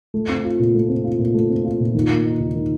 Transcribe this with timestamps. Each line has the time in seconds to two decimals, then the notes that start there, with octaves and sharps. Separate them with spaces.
0.14 A3
0.29 C4
0.44 F4
0.59 A#2
0.75 A3
0.89 C4
1.04 F4
1.19 A#2
1.34 A3
1.50 C4
1.65 F4
1.80 A#2
1.95 D#3
2.10 A#3
2.25 D#4
2.40 D#2
2.55 D#3